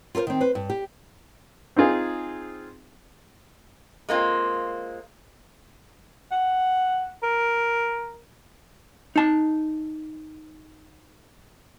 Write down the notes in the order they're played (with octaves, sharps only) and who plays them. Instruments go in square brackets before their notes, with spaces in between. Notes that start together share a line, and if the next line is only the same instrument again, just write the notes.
[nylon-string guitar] F4 G4 A4 A#4 C5
D#3 C4
B4 C5
G2
G4
[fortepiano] C4 D#4 F4 G#4
[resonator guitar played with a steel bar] G#3 A#3 C4 F4
[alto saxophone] F#5
A#4
[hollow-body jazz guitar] D#4 A5